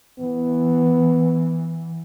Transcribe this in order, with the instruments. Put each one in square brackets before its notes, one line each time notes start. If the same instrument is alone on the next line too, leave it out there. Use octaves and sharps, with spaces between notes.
[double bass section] E3 [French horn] B3